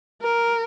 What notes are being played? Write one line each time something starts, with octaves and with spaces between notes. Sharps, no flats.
A#4